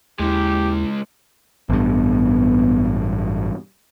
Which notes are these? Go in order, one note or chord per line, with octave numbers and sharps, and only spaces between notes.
D#2 C#3 G#3 E4 G4
A1 G2 B3